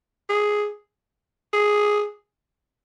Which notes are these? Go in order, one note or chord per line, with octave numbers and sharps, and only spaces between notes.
G#4
G#4